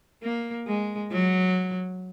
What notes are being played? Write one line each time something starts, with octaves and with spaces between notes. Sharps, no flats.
A#3
G#3
F#3